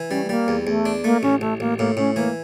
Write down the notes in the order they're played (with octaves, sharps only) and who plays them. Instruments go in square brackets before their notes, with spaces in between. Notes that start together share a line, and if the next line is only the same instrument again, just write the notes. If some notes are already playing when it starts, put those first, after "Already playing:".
Already playing: [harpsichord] E3
[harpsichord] G3 [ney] C#4
[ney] A3
[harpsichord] G3 [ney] A#3
[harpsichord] E2
[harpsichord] E2 [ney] A3
[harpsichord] D4
[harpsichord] A3 [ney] A#3
[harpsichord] A1 [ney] C#4
[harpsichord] A1 [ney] A3
[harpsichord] A1 [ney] A#3
[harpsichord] A2 [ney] A#3
[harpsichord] A2 [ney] C#4
[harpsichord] E3 [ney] A#3